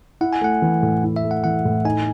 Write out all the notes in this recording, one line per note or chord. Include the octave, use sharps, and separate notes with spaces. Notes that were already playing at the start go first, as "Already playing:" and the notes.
E4 F#5
G#5
A3 F#5
E3
A2
E4
E5
A3
F#5
E3 F#5
A2
D#4 G#5